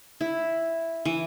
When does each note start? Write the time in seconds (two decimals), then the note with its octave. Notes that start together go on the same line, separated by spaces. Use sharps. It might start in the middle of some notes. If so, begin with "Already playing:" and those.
0.21 E4
1.05 E3